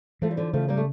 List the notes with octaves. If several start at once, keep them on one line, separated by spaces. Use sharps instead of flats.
E3 F3 A3
G3
D3 F3
C#3 F3 A3
G3 A#3
A3